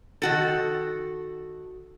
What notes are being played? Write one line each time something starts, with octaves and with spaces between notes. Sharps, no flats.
D#3 F#4 A4